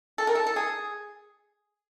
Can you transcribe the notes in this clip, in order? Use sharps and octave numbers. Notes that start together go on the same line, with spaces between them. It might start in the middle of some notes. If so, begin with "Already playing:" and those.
A4
A#4
A4
A4
G#4